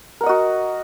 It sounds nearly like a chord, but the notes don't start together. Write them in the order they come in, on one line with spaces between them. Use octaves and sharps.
A#4 F#5 D#5 F#4